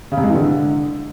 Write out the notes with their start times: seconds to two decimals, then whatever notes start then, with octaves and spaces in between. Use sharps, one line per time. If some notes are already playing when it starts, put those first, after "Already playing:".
0.12 C#3
0.18 C3
0.23 G#3
0.29 E3
0.35 D3